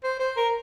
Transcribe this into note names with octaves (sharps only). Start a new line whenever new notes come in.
C5
C5
A#4